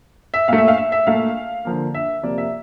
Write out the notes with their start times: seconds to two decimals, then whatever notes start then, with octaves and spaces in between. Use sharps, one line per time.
0.34 E5
0.48 A#2 A3 F5
0.58 E5
0.68 F5
0.78 E5
0.92 E5
1.07 A#2 A3 F5
1.65 D3 F3 A#3
1.95 E5
2.23 C3 F3 A#3 D5
2.38 E5